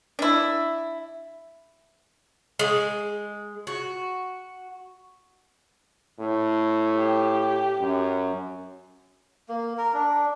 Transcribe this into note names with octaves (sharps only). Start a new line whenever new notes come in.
D4 E4
G#3
F#4
A2
G4
F#2
A#3
A#4
D4